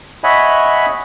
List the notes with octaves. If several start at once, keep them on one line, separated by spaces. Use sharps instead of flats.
C#5 D#5 E5 F#5 G#5 B5